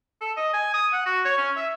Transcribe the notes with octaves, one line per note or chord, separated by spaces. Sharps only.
A4
D#5
G#5
D#6
F#5
F#4
C#5
C#4
E5